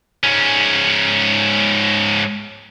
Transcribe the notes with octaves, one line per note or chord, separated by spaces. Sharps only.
G#2 C#4